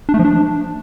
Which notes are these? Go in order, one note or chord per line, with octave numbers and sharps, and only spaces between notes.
D4
A3
F3
D4